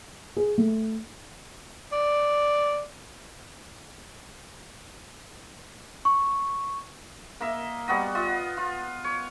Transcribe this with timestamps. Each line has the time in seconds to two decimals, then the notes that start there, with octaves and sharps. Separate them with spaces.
0.37 G#4
0.58 A3
1.92 D5
6.05 C#6
7.41 A#3 D#5 E5
7.88 G3 B3 F#4 D#5
8.15 F4 D#5
8.57 F4
9.04 C#5